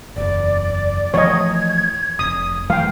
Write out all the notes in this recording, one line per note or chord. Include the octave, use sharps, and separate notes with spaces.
F#1 E2 D5
E3 F3 A3 C#5 D#5 G#6
F1 D#6
E3 G3 A3 F5 G5